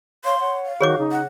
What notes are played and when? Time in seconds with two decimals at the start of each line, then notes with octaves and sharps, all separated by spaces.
0.25 C#5 F5 C6
0.40 C#5 F#5
0.65 F5
0.81 D#3 F#4 G#4 C#5 D6
0.99 C#3 D#4
1.12 F#5